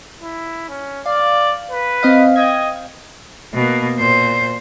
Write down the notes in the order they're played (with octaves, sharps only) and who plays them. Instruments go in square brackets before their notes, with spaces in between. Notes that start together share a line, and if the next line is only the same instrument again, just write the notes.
[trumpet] E4
C#4
[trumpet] D5 [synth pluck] F5
[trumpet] B4
[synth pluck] C4 D#5 F5
[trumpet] D#5 [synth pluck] G5 G#6
[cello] B2 A#3
A#2 C5